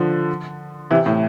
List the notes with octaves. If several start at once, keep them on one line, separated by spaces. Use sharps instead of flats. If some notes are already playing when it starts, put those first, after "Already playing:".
Already playing: D3 F3
C3 E3
A2